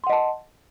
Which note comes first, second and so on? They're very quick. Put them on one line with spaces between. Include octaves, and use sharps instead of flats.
C6 F#5 D#5 A5